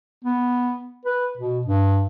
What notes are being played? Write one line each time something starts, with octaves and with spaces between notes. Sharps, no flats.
B3
B4
B2
G2